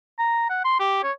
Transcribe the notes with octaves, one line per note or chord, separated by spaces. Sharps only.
A#5
F#5
C6
G4
C#5